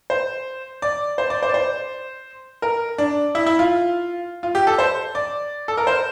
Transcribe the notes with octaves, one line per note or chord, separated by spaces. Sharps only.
C5
D5
C5
D5
C5
D5
C5
A#4
D4
E4
E4
F4
F4
G4
A4
C5
D5
A4
A#4
C5